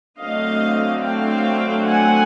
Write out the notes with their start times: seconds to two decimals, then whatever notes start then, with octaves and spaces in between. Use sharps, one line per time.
0.19 D3 F#3 A3 C4 D#5 F5
1.02 F5 G5
1.86 F#5 G#5